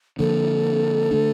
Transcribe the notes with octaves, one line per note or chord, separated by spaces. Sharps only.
D3 F3 A#3 D4 A4
D3 A3 D4